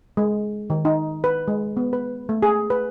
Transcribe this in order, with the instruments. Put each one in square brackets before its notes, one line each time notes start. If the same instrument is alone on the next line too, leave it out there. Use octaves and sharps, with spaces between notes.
[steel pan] G#3
D#3
D#4
B4
G#3
B3
B4
A3
G#4
B4